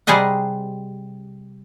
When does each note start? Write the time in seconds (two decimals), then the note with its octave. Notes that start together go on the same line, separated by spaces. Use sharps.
0.07 C3 G3 G#4 C5 D#5 F#5